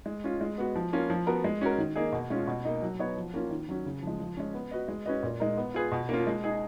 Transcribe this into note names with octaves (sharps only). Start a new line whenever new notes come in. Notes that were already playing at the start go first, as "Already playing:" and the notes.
G#3
C#4 F4
G#3
B3 F#4
F3
A#3 C#4 F4
F3
B3 F#4 A#4
G#3
C#4 F#4 A#4
D#3
A#3 D#4 G#4
B2
G#3 C#4 F4
B2
A#3 D#4
F#3
B3 D#4 F#4 C#5
F3
A#3 C#4 F4
D#3
F#3 C#4 F#4
C#3
F3 G#3
F3
G#3 C#4
B3
F#4 B4 D#5
G#3
C#4 F#4 B4 D#5
A#2
G#3 D#4 A#4
B3
F4 G#4 B4
B2
A#3 C#4 F4
G#3
D#4 G#4